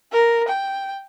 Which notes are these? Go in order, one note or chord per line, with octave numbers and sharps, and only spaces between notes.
A#4
G5